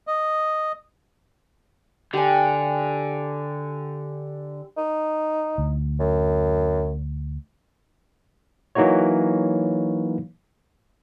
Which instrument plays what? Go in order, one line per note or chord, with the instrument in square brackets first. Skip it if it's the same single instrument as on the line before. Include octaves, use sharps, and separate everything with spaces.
[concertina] D#5
[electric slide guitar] D3 [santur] G4 G#5
[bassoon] D#4
[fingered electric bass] D2
[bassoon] F#2
[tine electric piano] E3 F#3 A#3 D#4 F#4 C#5